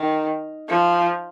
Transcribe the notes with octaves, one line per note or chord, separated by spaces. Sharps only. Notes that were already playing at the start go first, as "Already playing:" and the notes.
Already playing: D#3
F3